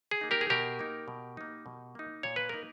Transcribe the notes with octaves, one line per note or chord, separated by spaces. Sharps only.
G#4
A#3 D#4
G4 A#4
G#4
B2 G4 A#4
A#3 D#4
B2
A#3 D#4
B2
A#3 D#4
A#2 C#5
B4
A#3 D#4 A#4